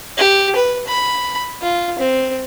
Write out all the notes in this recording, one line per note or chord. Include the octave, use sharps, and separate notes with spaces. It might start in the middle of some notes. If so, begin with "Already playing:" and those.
G4
B4
B5
F4
C4